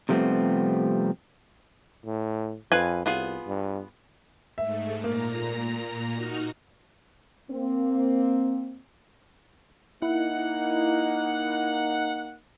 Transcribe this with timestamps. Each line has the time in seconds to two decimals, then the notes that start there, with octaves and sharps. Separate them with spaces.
0.09 C3 F3 G3 A3 B3 C4
2.06 A2
2.72 F2 F4 B4 G#5
3.06 C2 B3 F4 G#4
3.46 G2
4.58 G#2 A3 E5
5.04 A#2 A#3 A#5
6.13 D#4 F#4 F6
7.51 A#3 C4
10.02 A#3 D#4 E4 F#5